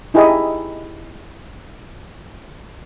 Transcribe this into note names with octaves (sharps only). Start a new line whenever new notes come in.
D#4 E4 G4 G#4 D#5